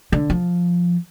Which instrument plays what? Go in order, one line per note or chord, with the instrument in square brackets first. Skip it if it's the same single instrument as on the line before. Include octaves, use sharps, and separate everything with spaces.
[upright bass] D3
F3